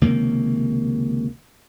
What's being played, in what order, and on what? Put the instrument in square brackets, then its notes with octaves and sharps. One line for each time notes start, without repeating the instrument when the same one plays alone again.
[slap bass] C#2 C3 D#3 A#3